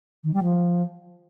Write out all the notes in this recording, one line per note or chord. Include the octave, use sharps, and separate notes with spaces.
D#3
G3
F3